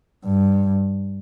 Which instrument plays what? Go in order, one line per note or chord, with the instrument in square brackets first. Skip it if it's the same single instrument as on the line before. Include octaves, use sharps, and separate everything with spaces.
[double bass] G2